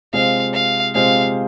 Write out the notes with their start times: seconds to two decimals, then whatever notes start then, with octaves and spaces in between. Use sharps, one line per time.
0.13 C3 G#3 F4 C5 F5
0.54 F5
0.94 C3 G#3 F4 C5 F5